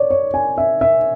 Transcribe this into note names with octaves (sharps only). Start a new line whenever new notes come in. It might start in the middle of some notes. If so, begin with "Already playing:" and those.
Already playing: C#5 D5
C#5
G#5
E5
E5